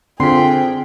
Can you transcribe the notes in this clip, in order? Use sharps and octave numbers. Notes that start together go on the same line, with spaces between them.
D3 C4 F4 G#4 G5 C6 B6